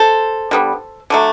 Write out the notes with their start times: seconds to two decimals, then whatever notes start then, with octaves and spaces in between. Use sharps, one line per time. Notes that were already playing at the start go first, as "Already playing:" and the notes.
Already playing: A4 C5
0.51 D3 G3 B3
1.10 D3 F#3 A3